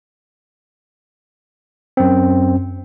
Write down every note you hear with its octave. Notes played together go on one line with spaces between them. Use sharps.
F#2 C4